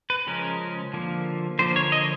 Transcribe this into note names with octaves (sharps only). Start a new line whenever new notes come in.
B4
C#3 F3 G#3 C#4 A#4
D3 F3 A#3
D3 F3 A#3 C5
C#5
D#5